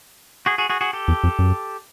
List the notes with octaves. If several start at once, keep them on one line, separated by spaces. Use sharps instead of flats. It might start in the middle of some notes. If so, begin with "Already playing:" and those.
F#4 G#4
F#4 G#4
F#4 G#4
F#4 G#4
G4 A4
E2
F2
F#2